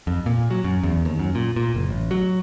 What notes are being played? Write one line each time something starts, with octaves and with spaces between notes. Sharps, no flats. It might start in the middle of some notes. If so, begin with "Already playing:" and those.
F2
A#2
F#3
F#2
E2
D#2
F#2
A#2
A#2
F#1
A1
F#3